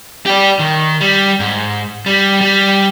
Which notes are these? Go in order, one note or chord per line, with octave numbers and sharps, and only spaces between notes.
G4 D5
D#3
G3
G#2
G3
G3